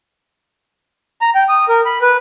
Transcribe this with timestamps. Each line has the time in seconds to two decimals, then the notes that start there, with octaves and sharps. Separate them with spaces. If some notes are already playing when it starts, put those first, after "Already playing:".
1.21 A#5
1.35 G5
1.49 D#6
1.69 A#4
1.86 B5
2.02 B4